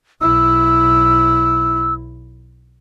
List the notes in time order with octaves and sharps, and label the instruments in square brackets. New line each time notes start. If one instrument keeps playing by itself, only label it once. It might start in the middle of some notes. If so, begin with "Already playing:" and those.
[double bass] B1 E4 [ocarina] E6